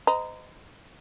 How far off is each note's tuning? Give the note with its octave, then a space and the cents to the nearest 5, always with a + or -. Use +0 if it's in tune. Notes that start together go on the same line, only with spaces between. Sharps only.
C5 -45 D#5 +0 A#5 +0